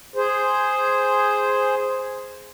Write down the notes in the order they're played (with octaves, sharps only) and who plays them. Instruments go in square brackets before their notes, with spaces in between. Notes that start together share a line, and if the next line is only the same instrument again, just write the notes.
[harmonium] G#4 C5